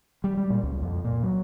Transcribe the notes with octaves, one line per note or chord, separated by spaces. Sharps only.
G3
G3
A#2
C#2
F2
A#2
F#3